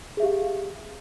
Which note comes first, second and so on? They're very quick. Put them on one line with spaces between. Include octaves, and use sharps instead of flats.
G#4 E5 G4 F5